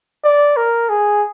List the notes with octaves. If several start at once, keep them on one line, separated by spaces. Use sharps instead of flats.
D5
A#4
G#4